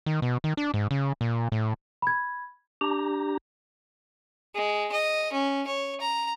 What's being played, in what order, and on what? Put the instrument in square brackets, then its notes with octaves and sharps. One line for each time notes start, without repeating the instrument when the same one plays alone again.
[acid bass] D#3
B2
D#3
D4
G#2
C#3
A#2
A2
[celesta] B5 G#6
[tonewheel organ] D4 G4 A#5
[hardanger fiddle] G#3
D#5
C#4
C#5
A#5